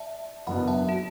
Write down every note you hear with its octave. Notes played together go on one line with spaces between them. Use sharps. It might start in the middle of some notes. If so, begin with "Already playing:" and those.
Already playing: D5 E5 A5
F#1 F#2 F#3 B3 D4 F#5 B5
E5 A5
F#4